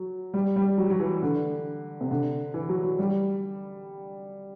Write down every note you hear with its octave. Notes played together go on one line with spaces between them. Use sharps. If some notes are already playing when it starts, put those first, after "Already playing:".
Already playing: F#3
G3
G3
F#3
F#3
E3
D3
C3
D3
E3
F#3
F#3
G3